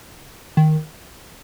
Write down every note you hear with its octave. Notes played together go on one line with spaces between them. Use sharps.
D#3